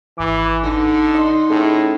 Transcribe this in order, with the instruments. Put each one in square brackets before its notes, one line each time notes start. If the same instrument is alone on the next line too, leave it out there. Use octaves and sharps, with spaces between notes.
[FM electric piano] G#1 D6 [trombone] E3
[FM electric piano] A1 [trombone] D3 [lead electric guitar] D#4
[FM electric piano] D#5 C6
[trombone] A2 [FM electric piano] C#4 G#4 A4